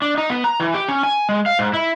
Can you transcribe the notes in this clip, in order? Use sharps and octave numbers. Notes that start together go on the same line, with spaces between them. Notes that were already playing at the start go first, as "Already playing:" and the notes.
D4
D#4
B3
A#5
E3
G4
C#4
G#5
G#3
F5
G#2
E4